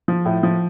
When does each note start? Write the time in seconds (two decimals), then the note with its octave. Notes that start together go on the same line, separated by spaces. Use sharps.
0.08 F3
0.25 A2
0.43 F3